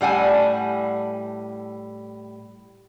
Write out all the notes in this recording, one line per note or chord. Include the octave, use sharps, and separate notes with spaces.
A2 G3 F#5 G#5 A5